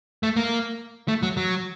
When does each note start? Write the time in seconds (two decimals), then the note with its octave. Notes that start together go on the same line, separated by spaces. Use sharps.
0.23 A3
0.36 A#3
1.08 A3
1.23 F#3
1.37 F#3